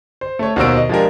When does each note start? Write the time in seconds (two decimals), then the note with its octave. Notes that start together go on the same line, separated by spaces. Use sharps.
0.21 C5
0.39 A3 C#5
0.56 D#2 B2 F#4 C5 E6 D7
0.77 D#5
0.89 F3 G#3 D4 G4 A#4